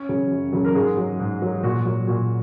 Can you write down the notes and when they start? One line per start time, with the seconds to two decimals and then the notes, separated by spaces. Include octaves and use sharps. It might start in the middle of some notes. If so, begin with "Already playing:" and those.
Already playing: C#4 C#5
0.09 C#3 F#3
0.31 F#2
0.53 C#3 F#3
0.65 A#4
0.75 G#2 G#3 G#4
0.97 F#3
1.20 G#2
1.42 F#3
1.63 A#2 F#4
1.85 F#3
2.07 A#2 F#4